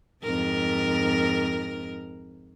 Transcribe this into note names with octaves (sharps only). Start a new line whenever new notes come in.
F2 G#2 A#4